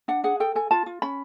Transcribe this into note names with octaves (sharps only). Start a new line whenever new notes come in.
D4 F#5
G#4 F#5
A4 G5
A4 G#5
F4 A5
F4
C#4 B5